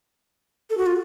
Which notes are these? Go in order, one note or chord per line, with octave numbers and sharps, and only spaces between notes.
A4
F#4
F4